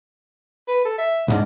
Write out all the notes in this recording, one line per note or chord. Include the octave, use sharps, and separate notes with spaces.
B4
A4
E5
C2 G#2 D4